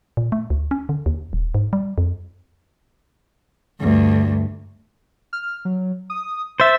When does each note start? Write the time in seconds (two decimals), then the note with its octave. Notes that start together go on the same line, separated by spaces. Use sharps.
0.17 A#2
0.32 A3
0.50 D2
0.71 C#4
0.89 D3
1.06 D#2
1.33 D#1
1.54 G#2
1.73 G3
1.98 F2
3.81 D2 G2
5.33 F6
5.65 F#3
6.10 D#6
6.60 C5 E5 A6